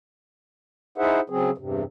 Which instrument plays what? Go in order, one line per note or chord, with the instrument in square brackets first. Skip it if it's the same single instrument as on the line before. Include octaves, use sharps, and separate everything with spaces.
[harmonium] D#4 E4 G#4 C5 E5 F#5
C#3 F#3 C4 G#4
E2 G2 C3